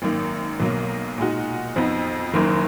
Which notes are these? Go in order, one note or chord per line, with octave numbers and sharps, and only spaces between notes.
G#1 F#2 D#3 A#3
B1 B2 F#3 A#3
A#2 G#3 D#4 F#4
F2 F3 B3 D#4
F#1 F#2 D#3 A#3